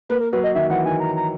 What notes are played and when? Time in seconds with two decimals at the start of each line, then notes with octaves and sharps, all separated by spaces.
0.09 A#3 B4
0.21 A#4
0.32 F#3 B4
0.44 D#5
0.55 D#3 E5
0.70 E3 F#5
0.85 D#3 G#5
1.00 A#5
1.16 A#5